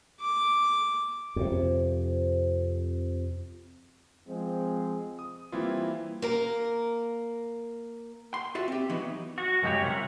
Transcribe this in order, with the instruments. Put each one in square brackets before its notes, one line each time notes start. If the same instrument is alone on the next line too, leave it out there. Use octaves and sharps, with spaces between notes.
[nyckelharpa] D6
[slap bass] F2 C3
[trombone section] F3 G#3 C4
[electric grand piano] D#6
E3 G3 A#3 C4 E4 F4
[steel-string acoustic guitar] A#3 A#4
[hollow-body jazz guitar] C6
F4 F#4 E5
C4 G4
E3 F#3 B3 D#4
[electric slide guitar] F#4
F#2 C#3 G#3 C#4 G4 C#5
C3 G3 F4 A#4 E5 F#5